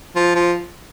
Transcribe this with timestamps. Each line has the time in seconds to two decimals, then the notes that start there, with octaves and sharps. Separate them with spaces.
0.15 F3
0.35 F3